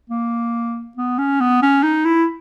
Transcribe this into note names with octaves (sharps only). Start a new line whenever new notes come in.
A#3
B3
C#4
B3
C#4
D#4
E4